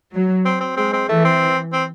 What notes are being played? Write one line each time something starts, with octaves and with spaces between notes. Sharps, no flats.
F#3
C4
C4
G#3 C4
C4
E3 A3
C4
C4